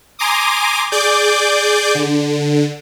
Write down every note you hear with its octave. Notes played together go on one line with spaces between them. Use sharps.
G#5 A#5 C6 D6 D#6
G#4 D5 D6 G6
D3